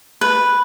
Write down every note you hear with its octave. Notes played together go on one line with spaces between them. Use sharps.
B4